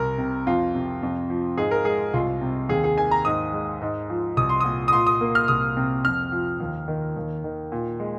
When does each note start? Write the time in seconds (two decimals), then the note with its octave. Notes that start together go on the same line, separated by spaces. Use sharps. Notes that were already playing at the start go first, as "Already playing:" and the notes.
Already playing: C2 A#4
0.18 C3
0.47 F2 F4
0.75 C3
1.03 F2
1.30 F3
1.58 G#2 G#4
1.71 A#4
1.85 G#3 G#4
2.14 C2 F4
2.41 C3
2.69 D#2 G#4
2.84 G#4
2.97 D#3 G#5
3.11 A#5
3.25 G#2 D#6
3.53 G#3
3.82 G#2
4.10 F3
4.37 C2 D#6
4.49 C6
4.61 A#2 D#6
4.88 D#6
4.93 A#2 C6
5.07 D#6
5.21 A#3
5.35 F6
5.48 C2 D#6
5.77 C3
6.05 F2 F6
6.32 F3
6.60 D#2
6.88 D#3
7.16 D#2
7.44 D#3
7.72 A#2
8.00 G#3